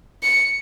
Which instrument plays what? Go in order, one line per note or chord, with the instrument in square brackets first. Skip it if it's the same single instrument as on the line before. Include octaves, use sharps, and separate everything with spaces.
[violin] C#7